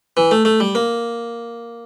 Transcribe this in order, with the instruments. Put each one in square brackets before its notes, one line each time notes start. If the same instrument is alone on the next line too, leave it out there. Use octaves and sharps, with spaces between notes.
[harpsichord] E3
A3
A3
G3
A#3